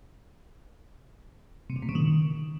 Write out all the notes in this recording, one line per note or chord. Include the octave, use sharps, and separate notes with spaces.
C3
D3
A#2
C#3
D#3